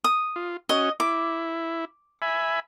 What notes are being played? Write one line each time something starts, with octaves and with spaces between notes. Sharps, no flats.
D#6
F4
C#4 F#4 D#5
E4 D6
E5 G#5 B5